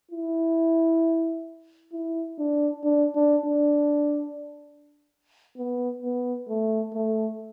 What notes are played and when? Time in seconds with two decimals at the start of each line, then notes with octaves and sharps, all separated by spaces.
0.11 E4
1.93 E4
2.38 D4
2.84 D4
3.15 D4
3.45 D4
5.57 B3
6.02 B3
6.49 A3
6.94 A3